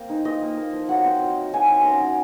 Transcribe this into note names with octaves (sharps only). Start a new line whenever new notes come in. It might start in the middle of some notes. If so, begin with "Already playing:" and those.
Already playing: A#3 C4
D#4
F4 D#5
A#3
A#3
F3
F#3 F#5
C4
F#3
F#3
F#3 G#5
F#3
C#4 A#5 C6
F#3